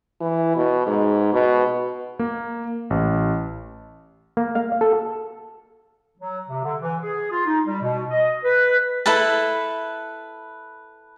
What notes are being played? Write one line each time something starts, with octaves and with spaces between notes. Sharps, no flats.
E3
B2
G#2
B2
A#3
A1
A#3
F5
A4
F#3
C3
D3
E3
G#4
F4
D#4
G3
B2
D#5
B4
E4 A4 B4 A5